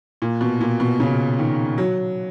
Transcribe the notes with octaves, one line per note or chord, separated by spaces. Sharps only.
A#2
B2
A#2
B2
C#3
D#3
F#3